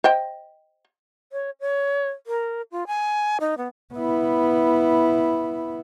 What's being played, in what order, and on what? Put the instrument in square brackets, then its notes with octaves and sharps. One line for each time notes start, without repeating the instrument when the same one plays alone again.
[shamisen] C5 D#5 G5
[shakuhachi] C#5
C#5
A#4
F4
G#5
D#4
B3
[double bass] B3 E4